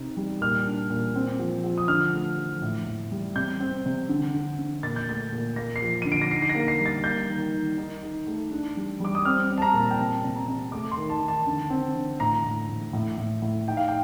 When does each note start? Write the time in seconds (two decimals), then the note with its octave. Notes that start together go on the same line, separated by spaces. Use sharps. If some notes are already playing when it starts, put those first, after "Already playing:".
Already playing: C3 D#4
0.17 G3
0.41 A#2 F6
0.66 D4
0.90 A#2
1.15 C4
1.39 F3
1.64 F3
1.78 D#6
1.88 D3 F6
2.13 A3
2.38 F3
2.62 A2
2.86 A2
3.11 G3
3.36 C3 G6
3.60 C4
3.86 C3
4.09 D3
4.34 D3
4.59 D3
4.83 A#2 A6
4.96 G6
5.08 A3 A6
5.32 A#2
5.56 A#3 A#6
5.76 C7
5.82 F3
6.02 D3 D#7
6.12 D7
6.22 A#6
6.31 D#4 C7
6.42 C7
6.49 A#6
6.55 A#3
6.68 C7
6.80 G3
6.86 A6
7.04 A#3 G6
7.29 D#3
7.53 D#3
7.78 D#4
8.03 D#4
8.27 A3
8.51 D4
8.77 G3
9.00 G3 D6
9.15 D#6
9.25 C4 F6
9.50 C4
9.58 A5
9.62 A#5
9.74 A#2
9.90 G5
9.99 C3 A5
10.24 C3
10.35 A#5
10.48 C3
10.72 A3 D6
10.91 C6
10.97 D#3
11.10 A5
11.22 D#3
11.28 A5
11.47 D3
11.70 C4
11.95 D3
12.20 A2 A#5
12.44 A2
12.69 A2
12.93 A2
13.18 A2
13.42 A2
13.68 D#4 G5
13.77 F5
13.88 G5